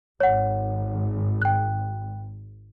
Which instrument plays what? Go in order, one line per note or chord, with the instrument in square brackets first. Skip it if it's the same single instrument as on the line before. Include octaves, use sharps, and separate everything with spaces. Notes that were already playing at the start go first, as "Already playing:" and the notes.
[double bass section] G#1 [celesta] C#5 F#5
[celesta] G5 F#6